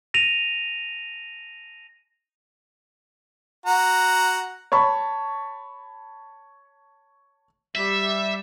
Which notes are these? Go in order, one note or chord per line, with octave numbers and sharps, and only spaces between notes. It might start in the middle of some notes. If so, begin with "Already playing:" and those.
A#6 D#7 F7
F#4 A#5
C#5 A5 B5 C#6
G3 E5